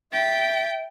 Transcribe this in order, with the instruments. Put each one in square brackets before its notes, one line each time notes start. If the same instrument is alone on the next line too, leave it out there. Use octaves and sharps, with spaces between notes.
[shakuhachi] E5 [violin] G5 [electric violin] A6 B6